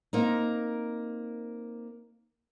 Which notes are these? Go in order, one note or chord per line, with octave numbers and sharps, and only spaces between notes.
A#3 C4 D#4